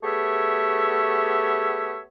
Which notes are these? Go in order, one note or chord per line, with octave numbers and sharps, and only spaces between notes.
A3 B3 G4 G#4 C#5 E5